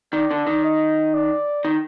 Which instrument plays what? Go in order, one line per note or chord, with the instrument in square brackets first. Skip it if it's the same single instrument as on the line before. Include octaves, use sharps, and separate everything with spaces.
[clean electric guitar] D#3 [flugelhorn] D5
[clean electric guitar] D3
D#3
[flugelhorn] D#5
D5
[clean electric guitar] D#3